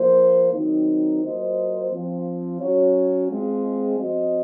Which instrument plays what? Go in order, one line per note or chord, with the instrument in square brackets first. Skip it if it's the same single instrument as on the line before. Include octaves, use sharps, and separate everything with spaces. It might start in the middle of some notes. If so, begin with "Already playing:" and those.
Already playing: [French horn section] F3 A#3 F4 C5
D#3 F#3 C4 D#4
F#3 A#3 F4 C5 D#5
F3 C4 F4
F#3 C#4 F#4 C#5
G#3 C4 F4
F3 C4 F#4 C5 D#5